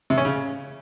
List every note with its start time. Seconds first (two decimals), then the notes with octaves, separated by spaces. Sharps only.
0.10 C3
0.17 C#4
0.25 C#3